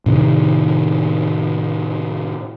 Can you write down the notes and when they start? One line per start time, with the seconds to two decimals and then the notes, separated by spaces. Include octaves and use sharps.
0.06 A2 C3 D#3